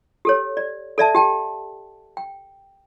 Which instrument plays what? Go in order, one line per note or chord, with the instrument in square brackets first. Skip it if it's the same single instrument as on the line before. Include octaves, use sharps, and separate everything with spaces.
[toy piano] G4 A4 C#5
D5
A4 D5 E5 A5
G4 G5 A5
G5